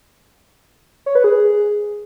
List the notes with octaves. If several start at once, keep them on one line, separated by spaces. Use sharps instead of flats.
C#5
B4
G#4